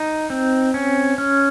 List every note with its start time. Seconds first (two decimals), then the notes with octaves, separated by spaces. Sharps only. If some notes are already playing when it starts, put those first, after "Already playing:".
Already playing: D#4
0.30 C4
0.74 C#4
1.18 C#4